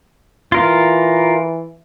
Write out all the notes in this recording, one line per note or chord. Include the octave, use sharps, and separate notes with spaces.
E3 F4 A#4